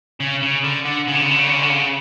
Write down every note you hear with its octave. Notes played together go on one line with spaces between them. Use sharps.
C#3
C#3
D3
D3
C#3
D3
C#3
D3
C#3
D3
C#3
D3
C#3